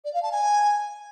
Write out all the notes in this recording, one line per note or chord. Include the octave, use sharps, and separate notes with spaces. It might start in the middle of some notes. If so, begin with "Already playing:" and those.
D5
F5
A5
G#5